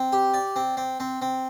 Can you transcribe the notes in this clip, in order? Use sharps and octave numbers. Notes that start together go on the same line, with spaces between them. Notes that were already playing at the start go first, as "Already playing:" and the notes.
Already playing: C4
G4
D5
C4
C4
C4
C4